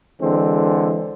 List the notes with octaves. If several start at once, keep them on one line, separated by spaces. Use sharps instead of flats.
D3 E3 G#3 C4